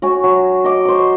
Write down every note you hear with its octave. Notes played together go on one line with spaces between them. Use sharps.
F#4 C#5 G#5
F#3
D#5 D6
C5 C#6